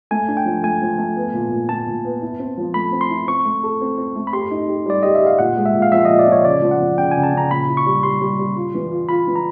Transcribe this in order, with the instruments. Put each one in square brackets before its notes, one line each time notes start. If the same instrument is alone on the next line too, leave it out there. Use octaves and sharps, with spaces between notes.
[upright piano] A3 [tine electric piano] G#5
[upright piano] D4
[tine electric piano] G5
[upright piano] F3
[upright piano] A3 [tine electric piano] G#5
[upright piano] F3
A3
B3
A#2
A#2
[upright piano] A#2 [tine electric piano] A5
[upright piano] A#2
B3
E4
C4
F3
[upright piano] A3 [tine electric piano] B5
[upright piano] C4
[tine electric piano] C6
[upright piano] E4
[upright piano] C4 [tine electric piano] C#6
[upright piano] A3
A4
C4
C4
A3
[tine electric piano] B5
[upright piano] G4 [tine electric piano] C6
[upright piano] D#4
G4
[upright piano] G3 [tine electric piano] D5
[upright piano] G4 [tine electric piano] D#5
[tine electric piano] E5
[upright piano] G4
[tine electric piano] F5
[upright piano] A#2 [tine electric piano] F#5
[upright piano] G#3
[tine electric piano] E5
[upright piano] A#2
[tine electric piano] F5
[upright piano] F3 [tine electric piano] E5
[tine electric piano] D#5
[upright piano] A#2
[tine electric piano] D5
[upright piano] F3
[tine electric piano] C#5
[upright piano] C#3 [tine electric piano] D5
[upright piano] F3
[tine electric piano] F#5
[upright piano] F3
[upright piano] C#3 [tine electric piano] G5
[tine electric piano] G#5
[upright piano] C#3
[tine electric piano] A5
[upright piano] C#3 [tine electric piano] A#5
[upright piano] A#2 [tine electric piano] B5
[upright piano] E4
[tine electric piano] C#6
[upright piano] G3
[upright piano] G3 [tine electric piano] C6
[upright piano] G3
G3
F4
E3
F4
[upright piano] F4 [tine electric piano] B5
[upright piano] E3
[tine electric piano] A#5